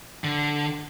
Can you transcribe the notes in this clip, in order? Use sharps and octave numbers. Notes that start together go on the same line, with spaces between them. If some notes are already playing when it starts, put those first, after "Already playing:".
D3